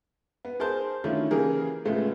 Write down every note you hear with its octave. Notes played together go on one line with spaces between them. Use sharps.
B3
G#4 A#4 C5 A5 C6 G6
D#3 A3 C#4 D4 E4 F4
C#3 E3 A#3 G4 G#4 A#4
A2 C#3 G#3 A3 B3 F4